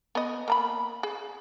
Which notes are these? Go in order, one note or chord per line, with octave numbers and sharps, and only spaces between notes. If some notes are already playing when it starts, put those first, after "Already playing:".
B3 D#5
A#3 A#5 B5
G#4